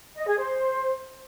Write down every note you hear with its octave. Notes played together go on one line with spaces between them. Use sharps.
D#5
G#4
C5